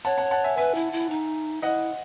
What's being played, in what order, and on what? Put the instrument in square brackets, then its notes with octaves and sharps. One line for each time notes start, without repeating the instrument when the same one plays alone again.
[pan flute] C#5 [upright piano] F#5 A5
[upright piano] F#5 A5
F#5 A5
E5 G#5
[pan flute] B4 [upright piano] E5 G#5
[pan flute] E4
E4
D#4
[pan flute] E4 [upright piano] D#5 F#5